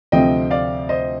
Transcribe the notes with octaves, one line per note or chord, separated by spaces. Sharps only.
D2 C3 F3 C4 D#5 G5
D5 F5
C5 D#5